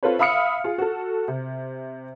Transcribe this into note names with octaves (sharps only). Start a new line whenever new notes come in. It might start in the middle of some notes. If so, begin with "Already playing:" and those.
C4 F4 A4 B4 C#5
E5 F5 B5 D#6 F6 C#7
F4 G#4
F#4 A4
C3